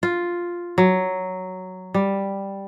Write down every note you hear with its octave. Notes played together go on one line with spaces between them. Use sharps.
F4
F#3
G3